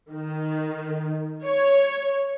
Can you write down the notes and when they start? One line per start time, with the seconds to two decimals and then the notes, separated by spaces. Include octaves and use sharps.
0.11 D#3
1.44 C#5